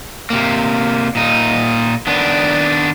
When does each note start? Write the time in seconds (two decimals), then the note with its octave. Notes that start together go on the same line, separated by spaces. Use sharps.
0.30 C3 A#3
1.15 A#2 D#4
2.07 D#3 B3 D4